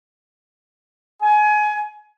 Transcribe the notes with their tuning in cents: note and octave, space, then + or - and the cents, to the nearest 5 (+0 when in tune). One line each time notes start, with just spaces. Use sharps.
G#5 +25